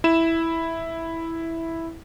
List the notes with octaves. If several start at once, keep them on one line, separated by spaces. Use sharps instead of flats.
E4 E7